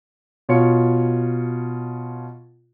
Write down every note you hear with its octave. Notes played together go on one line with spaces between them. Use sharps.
B2 F4 C#5 C#7